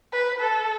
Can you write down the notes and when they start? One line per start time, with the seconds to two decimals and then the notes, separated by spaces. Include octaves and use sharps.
0.12 B4
0.41 A4